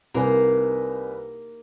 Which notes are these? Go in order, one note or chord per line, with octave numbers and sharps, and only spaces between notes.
C2 A#3 D#4 B4 G#5